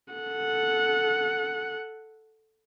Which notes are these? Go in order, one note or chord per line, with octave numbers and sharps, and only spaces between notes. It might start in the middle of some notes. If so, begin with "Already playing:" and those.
A4 F#5